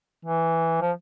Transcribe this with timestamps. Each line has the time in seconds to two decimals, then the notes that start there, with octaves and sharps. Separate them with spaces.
0.25 E3
0.82 F3